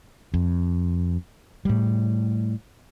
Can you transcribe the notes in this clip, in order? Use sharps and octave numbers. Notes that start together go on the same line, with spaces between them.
F2
A2 G3